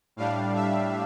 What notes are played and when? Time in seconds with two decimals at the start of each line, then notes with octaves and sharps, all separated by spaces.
0.16 A2 G3 D4 F5
0.55 E5